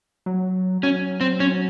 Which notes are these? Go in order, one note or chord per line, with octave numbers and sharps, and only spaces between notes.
F#3
F#3 C#4
C4
C#4